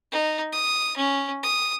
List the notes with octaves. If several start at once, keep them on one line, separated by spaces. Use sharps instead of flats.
D#4
D#6
C#4
D#6